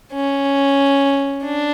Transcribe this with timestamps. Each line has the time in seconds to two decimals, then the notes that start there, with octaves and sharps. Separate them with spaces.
0.13 C#4
1.43 D4